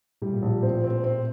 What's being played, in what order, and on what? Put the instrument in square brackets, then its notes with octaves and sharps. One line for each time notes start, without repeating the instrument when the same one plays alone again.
[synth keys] A2 [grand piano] G3
[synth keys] A#2
[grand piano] A#1 [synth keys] A2
[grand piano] C4
[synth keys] A#2 [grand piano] C4
[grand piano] C4